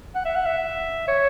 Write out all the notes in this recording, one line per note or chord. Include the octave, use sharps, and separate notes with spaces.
F#5
E5
F#5
E5
C#5